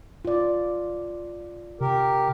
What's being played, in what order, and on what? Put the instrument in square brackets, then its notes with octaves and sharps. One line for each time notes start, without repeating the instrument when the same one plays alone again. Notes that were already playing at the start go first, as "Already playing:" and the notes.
[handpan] F4 D5
[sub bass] C3 [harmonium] G4 A#4